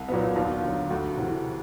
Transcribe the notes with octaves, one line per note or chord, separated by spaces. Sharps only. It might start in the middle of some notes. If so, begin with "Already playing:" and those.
Already playing: C2
A#2 F#3 B3
D#2 F4
D3 F#3
D2 F#4
C3 E3